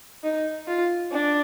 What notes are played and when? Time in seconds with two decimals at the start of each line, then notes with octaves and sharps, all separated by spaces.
0.24 D#4
0.68 F4
1.12 D4